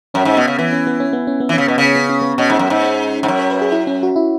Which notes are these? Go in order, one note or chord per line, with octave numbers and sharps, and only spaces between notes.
F#2 C#4
G#2
B2 B3
C#3
E3 B3
C#4
B3
C#4
B3
C#4
B3
E3
C#3 C#4
B2 B3
C#3 C#4
B3
C#4
B3
B2 C#4
G#2
F#2
G#2
G#2
F#2 C#5
C#5
B4
G#4
E4
C#4
F#4
E4